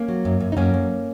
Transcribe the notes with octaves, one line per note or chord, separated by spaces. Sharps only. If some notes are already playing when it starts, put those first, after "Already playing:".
Already playing: A#3 C#4
F#3
F#2
F#2
D#4
F#2 A#3 C#4
F#2